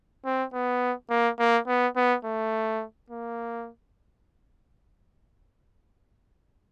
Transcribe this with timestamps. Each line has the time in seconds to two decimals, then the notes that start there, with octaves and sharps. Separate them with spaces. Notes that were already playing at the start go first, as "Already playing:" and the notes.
0.25 C4
0.54 B3
1.10 A#3
1.39 A#3
1.67 B3
1.96 B3
2.25 A3
3.10 A#3